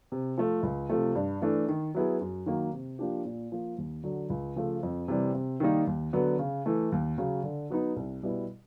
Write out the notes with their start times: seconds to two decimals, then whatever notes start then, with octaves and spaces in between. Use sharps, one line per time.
0.12 C3
0.38 F3 A3
0.63 C#2
0.89 C3 F3 A3
1.15 G2
1.41 E3 A3 D4
1.68 D#3
1.94 F#3 B3 E4 G#4
2.21 F#2
2.46 D#3 F#3 A#3
2.73 C3
2.99 F3 A#3 D4 G4
3.25 A#2
3.52 F3 A#3
3.78 D#2
4.03 D3 F#3
4.30 C#2
4.56 C#3 F3 A3
4.83 F2
5.08 C3 E3 G3
5.34 C3
5.60 D#3 G3 A#3 D#4
5.87 D#2
6.13 D3 F#3 B3
6.39 C#3
6.66 E3 A3
6.92 D#2
7.18 C#3 F#3
7.44 D3
7.70 F#3 B3 D#4
7.96 C2
8.23 B2 G3 B3 E4